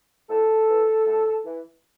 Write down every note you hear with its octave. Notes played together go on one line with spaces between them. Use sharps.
A2 A4
E3
A2
E3